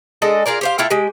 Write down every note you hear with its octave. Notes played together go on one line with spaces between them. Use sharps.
G#3 D4 A4 D#5
F4 G#4 A#4 D5
G4 C5 F5
A3 E4 F4 G5
G#3 G4